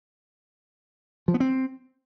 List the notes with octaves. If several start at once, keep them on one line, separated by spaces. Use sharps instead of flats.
F3
B3
C4